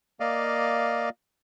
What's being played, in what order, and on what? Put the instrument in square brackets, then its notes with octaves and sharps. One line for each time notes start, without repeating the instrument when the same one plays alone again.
[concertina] A#3 D5 D#5 F5